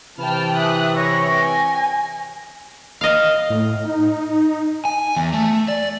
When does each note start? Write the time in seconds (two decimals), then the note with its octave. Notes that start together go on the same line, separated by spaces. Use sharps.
0.19 C3 E3 G5 A5 B5 F6
0.53 E5 D#6 F#6
0.96 C#5 G5 A#6
1.41 G#5
3.01 D#5 F5
3.50 A2
3.85 D#4
4.85 G#5
5.16 E2
5.33 A3
5.68 D5